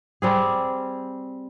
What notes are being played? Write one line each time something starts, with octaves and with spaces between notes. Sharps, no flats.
G3 C4 G#4